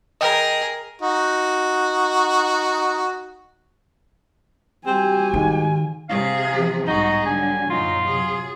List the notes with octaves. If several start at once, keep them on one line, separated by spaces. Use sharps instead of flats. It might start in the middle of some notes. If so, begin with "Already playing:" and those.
G#4 A#4 D#5 G5
D#4 F#4
G3 C4 F#4 G4 G#5
G#2 D#3
C3 G#4 F5
E3 F3
B1 G#2 G3 D#4 F#4 G#4
D3 F#3 G3 G#5
F#2 A#2 D3 F#3 D#4 F4
C3 F#3 G#4